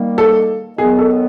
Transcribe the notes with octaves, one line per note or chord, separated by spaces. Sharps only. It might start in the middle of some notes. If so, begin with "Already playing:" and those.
Already playing: D#3 G3 A#3
A4
D#3 F#3 B3 G#4
A4